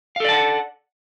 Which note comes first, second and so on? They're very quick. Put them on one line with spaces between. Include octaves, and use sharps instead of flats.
F5 A4 D5 A5 F#5